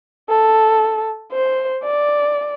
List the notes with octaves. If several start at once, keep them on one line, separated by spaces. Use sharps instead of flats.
A4
C5
D5